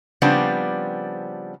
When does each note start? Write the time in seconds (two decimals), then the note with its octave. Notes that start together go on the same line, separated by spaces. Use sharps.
0.22 C#3 F3 G3 B3 C4 D4